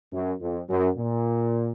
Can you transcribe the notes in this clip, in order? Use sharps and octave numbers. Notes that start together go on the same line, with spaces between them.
F#2
F2
F#2
A#2